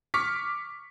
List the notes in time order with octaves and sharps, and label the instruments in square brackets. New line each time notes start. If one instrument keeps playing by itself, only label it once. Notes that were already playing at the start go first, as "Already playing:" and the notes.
[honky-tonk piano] C#6 D6 F6 B6 C#7